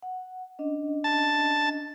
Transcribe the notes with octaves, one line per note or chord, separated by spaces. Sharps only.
F#5
C#4 D4 D#5
A5